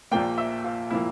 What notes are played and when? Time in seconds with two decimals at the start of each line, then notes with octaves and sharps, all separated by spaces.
0.11 A#1 A#2 F3 A#3 G5
0.38 E5
0.64 F4
0.90 A#2 F3 A#3 E4